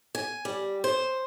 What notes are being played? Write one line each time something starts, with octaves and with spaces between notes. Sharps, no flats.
G#5
G3
C5